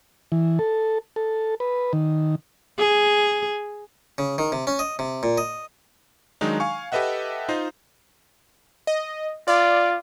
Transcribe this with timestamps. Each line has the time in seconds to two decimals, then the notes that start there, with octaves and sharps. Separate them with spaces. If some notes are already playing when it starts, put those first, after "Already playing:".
0.32 E3
0.59 A4
1.16 A4
1.60 B4
1.93 D#3
2.78 G#4
4.18 C#3
4.38 D#3
4.52 C3
4.67 C#4
4.79 D#5
4.99 C3
5.23 A#2
5.38 D#5
6.41 D#3 F#3 G#3 D4 D#4
6.60 F5 G#5 C#6
6.92 G4 A4 B4 D#5 E5 F#5
7.49 D#4 F4 C5 D#5
8.87 D#5
9.48 F4 D5